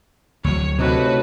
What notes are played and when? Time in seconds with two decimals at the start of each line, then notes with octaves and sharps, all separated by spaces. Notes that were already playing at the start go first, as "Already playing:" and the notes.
0.44 D2 F#3 C#5
0.79 A2 C3 D4 D#4 F#4 B4